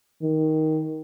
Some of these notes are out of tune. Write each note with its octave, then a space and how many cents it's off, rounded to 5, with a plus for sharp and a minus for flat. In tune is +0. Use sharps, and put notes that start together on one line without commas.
D#3 +10